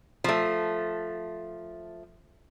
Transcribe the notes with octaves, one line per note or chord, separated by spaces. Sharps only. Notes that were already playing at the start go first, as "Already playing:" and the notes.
F3 A3